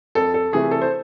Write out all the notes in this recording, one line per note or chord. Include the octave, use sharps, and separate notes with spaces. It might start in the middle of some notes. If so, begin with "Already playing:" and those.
F2 A4
A4
C3 E3 A3 G#4
A4
C5